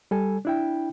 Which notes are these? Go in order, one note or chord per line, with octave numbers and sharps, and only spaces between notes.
G3 A4 G#5
D4 E4 G5